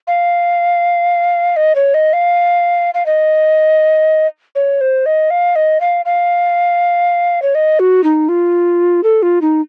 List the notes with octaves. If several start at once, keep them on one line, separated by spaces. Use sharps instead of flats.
F5
D#5
C#5
D#5
F5
F5
D#5
C#5
C5
D#5
F5
D#5
F5
F5
C#5
D#5
F#4
D#4
F4
A4
F4
D#4